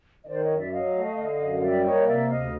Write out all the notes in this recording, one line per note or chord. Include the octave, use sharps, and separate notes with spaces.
D#5
D#3 C5 D5
C#5 D#5
F#2
D5 E5
F#3 D#5 F5
A3
D3
F#2
G3 D5 E5
A#3 C#5 D#5
C3 D5 E5
D2 D#5 F5